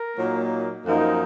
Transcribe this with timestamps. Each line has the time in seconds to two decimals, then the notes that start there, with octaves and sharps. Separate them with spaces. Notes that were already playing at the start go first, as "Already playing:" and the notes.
Already playing: A#4
0.17 A#2 F#3 A#3 D#4
0.86 F#2 F3 A#3 D#4